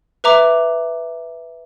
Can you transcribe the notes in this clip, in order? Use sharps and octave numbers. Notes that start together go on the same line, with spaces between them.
B4 E5 A#5 D6